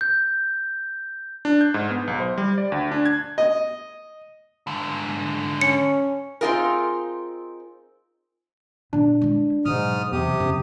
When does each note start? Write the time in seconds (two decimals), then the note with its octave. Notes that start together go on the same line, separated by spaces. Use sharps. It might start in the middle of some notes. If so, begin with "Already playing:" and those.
0.01 G6
1.45 D4
1.61 G6
1.74 G#2
1.91 B3
2.07 B1
2.20 C5
2.38 G3
2.58 D5
2.72 D2
2.91 D4
3.06 G#6
3.38 D#5
4.67 G#2 D3
5.61 C#4 C#7
6.41 C4 D#4 F4 G#4 A#4
8.93 A#2 B3 D4
9.22 G#3 E4
9.65 G#2 B2 F#3 D#6 F6
10.12 E2 C3 G4 D#6
10.40 F#2 C#3